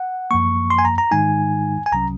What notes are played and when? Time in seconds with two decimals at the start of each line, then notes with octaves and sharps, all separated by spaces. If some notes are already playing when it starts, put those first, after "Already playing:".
Already playing: F#5
0.31 F#2 F3 A#3 C#6
0.70 C6
0.79 G#5
0.85 A#5
0.98 A#5
1.11 G#2 D#3 G#3 D#4 G#5
1.86 G#5
1.92 C2 C3 F#3 C#4 A#5